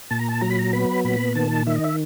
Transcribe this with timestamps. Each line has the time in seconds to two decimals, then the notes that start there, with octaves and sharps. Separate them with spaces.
0.11 A#2 A5
0.20 A#5
0.29 A5
0.41 F#3 A#5
0.50 B5
0.59 A#5
0.73 B3 B5
1.04 A#2 B5
1.35 D#3 A5
1.67 D#3 E5
1.76 D#5
1.84 E5